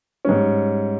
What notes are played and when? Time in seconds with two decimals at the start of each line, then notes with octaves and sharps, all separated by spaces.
0.25 G#2 G3 C#4